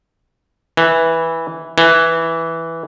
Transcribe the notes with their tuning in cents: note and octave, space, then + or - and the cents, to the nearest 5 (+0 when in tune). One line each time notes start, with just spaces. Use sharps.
E3 -10
E3 -5